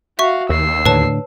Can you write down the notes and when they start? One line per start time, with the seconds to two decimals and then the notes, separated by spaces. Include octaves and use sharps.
0.19 F#4 E5 F5 C#6
0.49 D#2 E6 C7
0.86 A2 D3 B4 C#5 A5